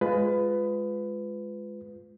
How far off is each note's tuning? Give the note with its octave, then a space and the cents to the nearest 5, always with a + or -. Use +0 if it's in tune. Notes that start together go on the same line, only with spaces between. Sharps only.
G#3 +0 F4 +0 B4 +20